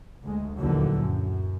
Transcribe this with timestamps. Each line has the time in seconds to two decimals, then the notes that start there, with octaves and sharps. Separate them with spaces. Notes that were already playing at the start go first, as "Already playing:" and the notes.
0.22 D2 G#3
0.57 A#1 D#2 D3 E3 F#3
0.98 F#2